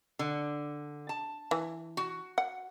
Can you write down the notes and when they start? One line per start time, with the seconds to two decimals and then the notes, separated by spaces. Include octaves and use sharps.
0.19 D3
1.09 A5
1.51 E3
1.97 F#4
2.38 F#5